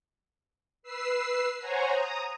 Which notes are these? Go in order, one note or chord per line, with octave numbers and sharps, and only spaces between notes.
B4 E6 C7
C5 C#5 F#5 G#5 A#5
A#5 D#6